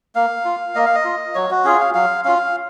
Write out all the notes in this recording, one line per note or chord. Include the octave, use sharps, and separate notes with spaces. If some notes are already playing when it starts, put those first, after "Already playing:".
A#3 F5
F4
A#3 D#5
F5
D#5
F4
F#3 C#5
F#4
C#4 F4 G#4
F5
F#3 F5
C#4 F4 F5